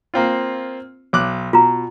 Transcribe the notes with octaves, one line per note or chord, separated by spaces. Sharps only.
A#3 C4 F4
B1 C#5 D6 F#6
B2 F4 A#5